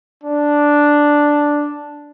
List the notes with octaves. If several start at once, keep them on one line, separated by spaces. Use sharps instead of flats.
D4